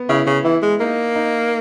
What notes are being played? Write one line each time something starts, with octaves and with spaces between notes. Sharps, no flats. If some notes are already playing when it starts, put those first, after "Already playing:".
Already playing: B3
C#3 E4
C#3
E3 E4
G#3
A#3 D#4
D#4